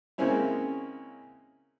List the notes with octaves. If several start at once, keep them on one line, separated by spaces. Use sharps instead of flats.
C#3 G#3 A#3 C4 C#4 E4